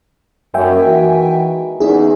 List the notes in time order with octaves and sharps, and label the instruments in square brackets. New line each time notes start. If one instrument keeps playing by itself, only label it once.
[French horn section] F#2 [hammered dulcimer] D#3 G#3 A#3 [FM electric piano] E5 G5 G#5
[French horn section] E3 F#4
[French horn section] E2 [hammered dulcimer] E3 C#4 E5 [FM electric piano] D#4 G#4